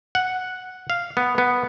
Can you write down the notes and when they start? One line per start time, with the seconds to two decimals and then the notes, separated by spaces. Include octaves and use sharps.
0.15 F#5
0.90 F5
1.17 B3
1.38 B3